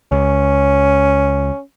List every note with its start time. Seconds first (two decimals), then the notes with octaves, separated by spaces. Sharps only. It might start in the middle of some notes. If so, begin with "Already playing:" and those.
0.12 C#2 C#4